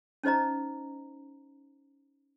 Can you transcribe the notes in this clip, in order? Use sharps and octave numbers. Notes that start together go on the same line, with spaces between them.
C#4 D#4 C5 D#5 A#5